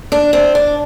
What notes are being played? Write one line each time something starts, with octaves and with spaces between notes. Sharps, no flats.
D4
C4
D4